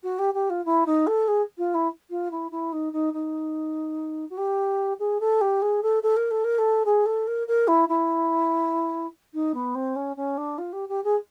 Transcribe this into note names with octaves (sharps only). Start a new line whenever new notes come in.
F#4
G4
G4
F4
E4
D#4
A4
G#4
F4
E4
F4
E4
E4
D#4
D#4
D#4
F#4
G4
G#4
A4
G4
G#4
A4
A4
A#4
A4
A#4
A4
G#4
A4
A#4
A#4
E4
E4
D#4
B3
C4
C#4
C#4
D4
F4
G4
G4
G#4